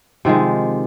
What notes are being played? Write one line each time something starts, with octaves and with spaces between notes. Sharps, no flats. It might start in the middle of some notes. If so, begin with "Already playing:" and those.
C3 D#3 F3 G#3